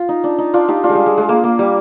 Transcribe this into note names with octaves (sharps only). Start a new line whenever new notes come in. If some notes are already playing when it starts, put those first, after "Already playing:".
Already playing: F4
D#4
D4
D#4
D4 F4
D#4 G4
D4 F4
G#3
G3
G#3
G#3
A#3
A#3
G3